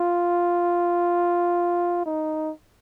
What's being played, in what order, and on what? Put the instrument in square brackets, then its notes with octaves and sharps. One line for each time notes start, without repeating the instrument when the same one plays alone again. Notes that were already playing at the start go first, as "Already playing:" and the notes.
Already playing: [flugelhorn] F4
D#4